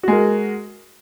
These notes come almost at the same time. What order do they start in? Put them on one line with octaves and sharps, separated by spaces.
F#4 G#3 A#4